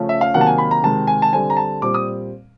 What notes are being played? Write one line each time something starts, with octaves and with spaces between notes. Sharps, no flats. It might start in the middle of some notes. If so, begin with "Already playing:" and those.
Already playing: C#3 F3 A3 C#4
E5
F5
C3 D#3 F#3 A#3 F#5
A5
G#5
B5
A#5
C3 D#3 G#3 A5
G#5
A5
D3 G3 C4 G#5
A#5
A5
A#2 G3 C4 D6
D#6